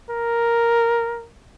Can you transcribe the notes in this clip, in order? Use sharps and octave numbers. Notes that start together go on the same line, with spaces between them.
A#4